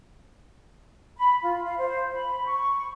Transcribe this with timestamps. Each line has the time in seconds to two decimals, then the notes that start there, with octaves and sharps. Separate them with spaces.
1.17 B5
1.42 F4
1.65 F5
1.78 C5
2.14 B5
2.47 C#6